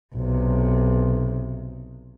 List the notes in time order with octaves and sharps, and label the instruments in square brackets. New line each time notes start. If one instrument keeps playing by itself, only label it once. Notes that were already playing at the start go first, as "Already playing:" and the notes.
[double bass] B1 C3